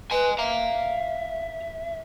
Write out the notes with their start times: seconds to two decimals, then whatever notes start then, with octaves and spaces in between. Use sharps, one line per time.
0.11 B4 D#5 G#5
0.39 E5 F5 A#5